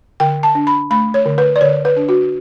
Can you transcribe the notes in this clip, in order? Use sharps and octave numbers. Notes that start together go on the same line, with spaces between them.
D3 G5
A5
D4
B5
A3 B5
C#5
D3
B4
D5
D3 C#5
B4
D4
F#4